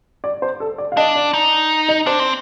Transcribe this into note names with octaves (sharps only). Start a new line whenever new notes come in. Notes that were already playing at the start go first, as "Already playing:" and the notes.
D5
C5
A4
D5
F5
D4 D#5
D5
D#4
D#5
D4 C5
C4